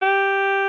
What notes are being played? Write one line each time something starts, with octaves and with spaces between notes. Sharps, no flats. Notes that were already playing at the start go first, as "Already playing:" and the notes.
G4